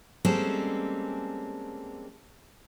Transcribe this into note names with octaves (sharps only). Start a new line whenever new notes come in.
G3 G#3 A#3 C4 C#4 A4